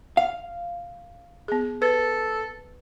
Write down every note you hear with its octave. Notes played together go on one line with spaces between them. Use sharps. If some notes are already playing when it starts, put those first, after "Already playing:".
F5
B3 G#4
A4 B4